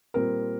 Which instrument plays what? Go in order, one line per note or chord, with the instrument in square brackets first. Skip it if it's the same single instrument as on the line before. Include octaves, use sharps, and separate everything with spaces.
[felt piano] A#2 G3 C4 A#4